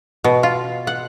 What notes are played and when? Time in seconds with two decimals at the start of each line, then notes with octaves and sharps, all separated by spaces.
0.24 B2
0.43 F4
0.87 F#5